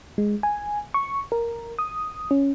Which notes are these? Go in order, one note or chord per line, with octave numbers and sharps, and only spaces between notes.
G#3
G#5
C#6
A#4
D#6
C#4